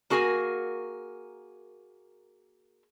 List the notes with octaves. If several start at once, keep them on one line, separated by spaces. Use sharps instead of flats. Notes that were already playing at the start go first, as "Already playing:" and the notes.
A#3 F#4 G#4 A#4 G#5